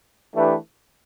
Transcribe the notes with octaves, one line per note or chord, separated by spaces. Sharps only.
E3 A3 D4 G4 B4